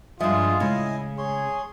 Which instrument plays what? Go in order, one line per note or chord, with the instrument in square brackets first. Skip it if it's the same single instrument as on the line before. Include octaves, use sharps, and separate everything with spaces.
[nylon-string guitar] G2 F3 [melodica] G#3 G#4 [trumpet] F4 [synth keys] E5 F5
[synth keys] A2 G#3 [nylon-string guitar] C#3 [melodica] E4 D#5 G#5
[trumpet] G#4 [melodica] C#5 C6